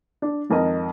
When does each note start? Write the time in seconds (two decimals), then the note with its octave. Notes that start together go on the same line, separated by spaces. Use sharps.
0.22 D4
0.50 G#1 F2 A#4 D#5